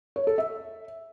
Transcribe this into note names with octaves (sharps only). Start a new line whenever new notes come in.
C#5
A4
E5